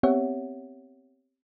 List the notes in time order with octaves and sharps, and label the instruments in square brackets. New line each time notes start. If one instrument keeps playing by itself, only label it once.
[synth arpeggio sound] B3 C4 G4 C#5 E5 F#5